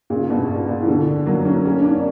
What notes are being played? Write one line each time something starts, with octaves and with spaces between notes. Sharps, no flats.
A#2 C#3
G2 B2
A#2
A#2
E3
B2 D3
F#3 A#3
A#3 C#4
A#3 C#4
D4
A#3 C#4